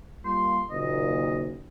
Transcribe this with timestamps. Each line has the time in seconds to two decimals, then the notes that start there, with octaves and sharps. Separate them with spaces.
0.25 G3 A#3 F4 C6
0.70 F#1 A#2 D#3 D#5